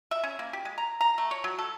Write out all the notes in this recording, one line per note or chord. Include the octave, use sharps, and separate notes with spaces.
E5
C#4
A#3
G4
G#3
A#5
A#5
A3
C#5
F#3
A4